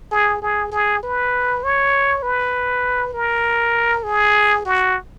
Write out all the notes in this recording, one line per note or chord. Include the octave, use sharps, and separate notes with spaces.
G#4
G#4
G#4
B4
C#5
B4
A#4
G#4
F#4